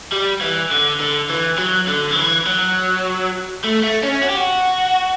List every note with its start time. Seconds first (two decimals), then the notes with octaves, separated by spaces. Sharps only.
0.12 G3
0.41 E3
0.72 D3
1.00 D3
1.30 E3
1.59 F#3
1.88 D3
2.12 F#3
2.17 E3
2.47 F#3
3.64 A3
3.83 A3
4.03 C#4
4.23 F#4
4.29 G4
4.37 F#4